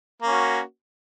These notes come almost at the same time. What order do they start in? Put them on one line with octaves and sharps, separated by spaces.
A#3 C#4 F#4